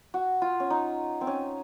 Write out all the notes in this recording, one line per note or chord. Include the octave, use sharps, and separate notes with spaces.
F#4
F4
C#4
D#4
C4
C#4